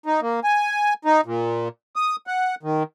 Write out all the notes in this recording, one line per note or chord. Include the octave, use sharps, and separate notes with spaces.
D#4
A#3
G#5
D#4
A#2
D#6
F#5
D#3